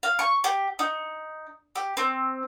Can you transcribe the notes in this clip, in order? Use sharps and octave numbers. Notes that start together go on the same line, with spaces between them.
F5
C#6
G4
D#4
G4
C4